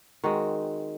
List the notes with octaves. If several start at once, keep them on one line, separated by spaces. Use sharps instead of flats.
D#3 G#3 C4 F#4